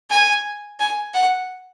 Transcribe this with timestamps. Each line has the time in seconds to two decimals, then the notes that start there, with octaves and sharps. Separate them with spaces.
0.11 G#5
0.80 G#5
1.14 F#5